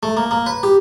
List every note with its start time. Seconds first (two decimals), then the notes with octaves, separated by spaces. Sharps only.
0.03 A3
0.17 A#3
0.31 A#3
0.46 B4
0.63 G4